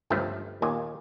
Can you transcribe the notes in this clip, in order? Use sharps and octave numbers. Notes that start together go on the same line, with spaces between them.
G1 C#2 G2 F3 A3
D#2 A#2 D#5 G#5